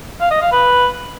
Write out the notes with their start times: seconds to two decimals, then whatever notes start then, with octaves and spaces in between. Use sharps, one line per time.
0.21 F5
0.31 D#5
0.42 F5
0.52 B4